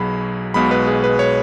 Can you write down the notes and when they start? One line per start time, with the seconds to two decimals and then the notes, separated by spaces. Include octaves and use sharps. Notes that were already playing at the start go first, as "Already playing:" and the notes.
Already playing: B1 B2 F#3 G#4 B5
0.54 B1 B2 G#3 B5
0.71 B4
0.87 G#4
1.04 B4
1.19 C#5